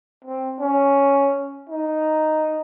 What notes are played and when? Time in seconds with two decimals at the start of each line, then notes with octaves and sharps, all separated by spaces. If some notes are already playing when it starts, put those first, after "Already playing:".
0.25 C4
0.60 C#4
1.70 D#4